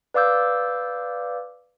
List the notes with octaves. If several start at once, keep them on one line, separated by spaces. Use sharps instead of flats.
B4 D5 F5 D6 E6 G6